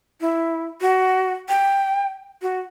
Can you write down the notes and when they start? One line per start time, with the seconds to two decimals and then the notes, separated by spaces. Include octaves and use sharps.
0.21 E4
0.81 F#4
1.49 G5
2.42 F#4